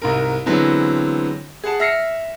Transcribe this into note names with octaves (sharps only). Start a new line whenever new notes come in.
C2 G#2 A#4
D3 E3 F#3 G#3 B3 C4
G#4 F#5 A5
E5 F6 A#6 C7 C#7